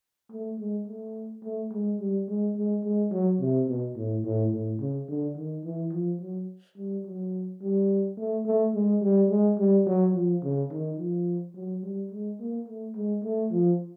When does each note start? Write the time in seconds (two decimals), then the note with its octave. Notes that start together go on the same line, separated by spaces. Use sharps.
0.31 A3
0.59 G#3
0.88 A3
1.44 A3
1.72 G#3
2.00 G3
2.28 G#3
2.56 G#3
2.84 G#3
3.11 F#3
3.40 C3
3.68 B2
3.96 A2
4.24 A2
4.52 A2
4.80 C#3
5.09 D3
5.36 D#3
5.65 E3
5.92 F3
6.21 F#3
6.77 G3
7.05 F#3
7.62 G3
8.17 A3
8.46 A3
8.74 G#3
9.02 G3
9.30 G#3
9.59 G3
9.86 F#3
10.14 F3
10.43 C#3
10.71 D#3
10.98 F3
11.55 F#3
11.83 G3
12.11 G#3
12.40 A#3
12.67 A3
12.95 G#3
13.23 A3
13.51 F3